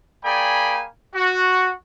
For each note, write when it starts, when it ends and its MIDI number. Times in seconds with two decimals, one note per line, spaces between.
0.25 0.85 58
0.25 0.85 68
0.25 0.85 74
0.25 0.85 79
0.25 0.85 80
0.25 0.85 83
1.15 1.72 66